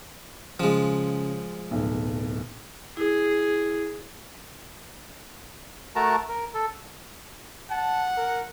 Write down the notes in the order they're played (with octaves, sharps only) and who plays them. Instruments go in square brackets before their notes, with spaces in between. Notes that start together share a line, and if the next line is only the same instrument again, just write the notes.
[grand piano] C#3 [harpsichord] F3 G#3
[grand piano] D1 B1
[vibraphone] E4 [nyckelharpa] G#4
[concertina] A3 F#4 A#4 A5 A#5
A#4
A4
[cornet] F#5 [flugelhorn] A5
[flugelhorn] A#4